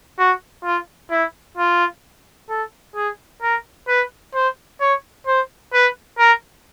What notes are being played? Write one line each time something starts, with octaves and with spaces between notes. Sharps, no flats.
F#4
F4
E4
F4
A4
G#4
A#4
B4
C5
C#5
C5
B4
A#4